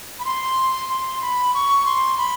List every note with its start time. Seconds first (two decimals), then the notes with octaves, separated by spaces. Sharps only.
0.19 B5
0.25 C6
0.89 C6
1.22 B5
1.54 C#6
1.85 C6
2.18 B5